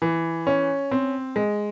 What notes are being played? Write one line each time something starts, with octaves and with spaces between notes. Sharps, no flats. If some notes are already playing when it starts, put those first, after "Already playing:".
E3
C#4
C4
G#3